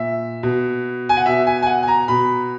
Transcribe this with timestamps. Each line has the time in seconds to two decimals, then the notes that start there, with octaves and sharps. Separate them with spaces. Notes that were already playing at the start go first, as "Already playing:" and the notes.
Already playing: A#2 E5
0.43 B2
1.09 G#5
1.17 F#5
1.26 B2 E5
1.47 G#5
1.62 G#5
1.67 F#5
1.83 G#5
1.88 A#5
2.08 B2 B5